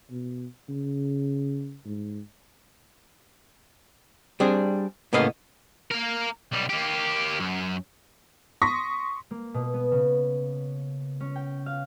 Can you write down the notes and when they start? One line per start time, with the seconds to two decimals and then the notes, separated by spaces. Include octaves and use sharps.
0.11 B2
0.69 C#3
1.85 G#2
4.40 G3 C4 D4 G#4
5.13 A2 C#3 A#3 B3 D#5 F5
5.92 A#3 A#4
6.52 B1 G3
6.70 A#3 G4
7.40 F#2
8.62 C6 C#6 D#6 A#6 B6
9.31 A#3
9.54 B2
9.74 B3
9.92 C#3
11.21 C#4
11.36 G5
11.66 F5